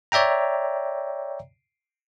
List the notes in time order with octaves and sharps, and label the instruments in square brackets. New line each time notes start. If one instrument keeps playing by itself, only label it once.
[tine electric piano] C#5 D5 E5 G5 A#5